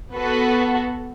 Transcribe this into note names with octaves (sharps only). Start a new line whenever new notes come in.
B3 F#4 A4 B4